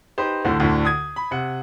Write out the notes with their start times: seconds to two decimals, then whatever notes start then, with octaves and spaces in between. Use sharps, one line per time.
0.18 D#4 G4 B4 C5
0.45 D2 A2 D3 C5
0.60 D2 A2 D3
0.85 D#6 G#6
1.16 B5
1.31 C3 F#5